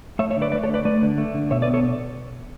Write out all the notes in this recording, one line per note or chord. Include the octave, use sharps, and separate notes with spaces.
A3 C#5 E5
C#5 E5
D3
B4 D5
A3 B4 D5
A4 C#5
D3
B4 D5
A3 B4 D5
D3
A3
D3
B2 C#5 E5
B4 D5
B3
A4 C#5